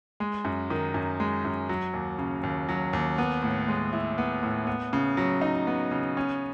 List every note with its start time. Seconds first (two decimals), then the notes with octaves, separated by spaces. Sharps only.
0.20 G#3
0.45 F#2
0.70 D#3
0.94 F#2
1.20 G#3
1.45 F#2
1.69 F#3
1.94 D#2
2.19 C#3
2.43 D#2
2.69 F#3
2.93 D#2
3.18 B3
3.43 A2
3.68 G#3
3.93 E4
4.18 B3
4.43 A2
4.67 B3
4.93 C#3
5.17 F#3
5.41 D#4
5.67 B3
5.91 C#3
6.17 C#4